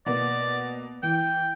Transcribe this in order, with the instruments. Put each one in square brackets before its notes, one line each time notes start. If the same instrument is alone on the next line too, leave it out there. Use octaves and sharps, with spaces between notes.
[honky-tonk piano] B2 A#3 B3 [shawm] D5
[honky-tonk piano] E3 [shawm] G5